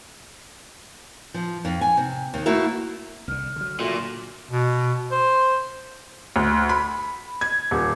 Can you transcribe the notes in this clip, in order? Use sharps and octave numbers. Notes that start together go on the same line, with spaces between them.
F3
F2
G#5
C3
D#2
A3 A#3 E4 F#4 A#4
C2 D3 F6
D3 F#3
A#2 F4 F#4 A4 E5
B2
C5
D2
B5
G#6
D#1